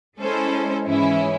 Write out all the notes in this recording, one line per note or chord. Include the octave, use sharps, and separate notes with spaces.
G#3 C#4 E4 A4 C5
G#2 E3 G#3 C#4 E4